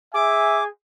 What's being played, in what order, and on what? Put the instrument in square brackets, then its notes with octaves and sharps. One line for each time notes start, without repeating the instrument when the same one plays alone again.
[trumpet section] G#4 G#5 [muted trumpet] E5 [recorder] D6